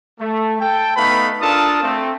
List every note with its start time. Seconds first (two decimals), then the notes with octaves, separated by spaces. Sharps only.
0.19 A3
0.60 A4 G5
0.96 A3 B3 D#4 B4 F5 B5
1.41 D4 F4 A4 A#4 A5 D#6
1.82 A3 C4